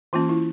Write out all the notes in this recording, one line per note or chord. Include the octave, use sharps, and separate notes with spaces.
E3 A#3 C#4 F4
E4